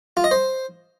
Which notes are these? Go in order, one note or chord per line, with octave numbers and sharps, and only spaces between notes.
F4
D#5
C5